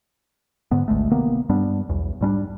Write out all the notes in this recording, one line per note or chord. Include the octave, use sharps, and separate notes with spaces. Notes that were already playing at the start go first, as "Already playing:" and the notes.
G#2 D3 B3
G#1 D2 G#3 A3
C3 D#3 A#3 B3
G2 G3 B3 D4
B1 E2
G#2 G3 C#4 D4